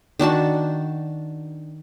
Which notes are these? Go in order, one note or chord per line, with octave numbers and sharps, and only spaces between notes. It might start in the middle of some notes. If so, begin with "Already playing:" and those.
D#3 D4 F#4 A5